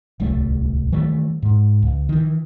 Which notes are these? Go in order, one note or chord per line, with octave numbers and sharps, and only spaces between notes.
D1 C2 G3 A3
D#3 E3 G3 A3
G#2
C#2
D#3 E3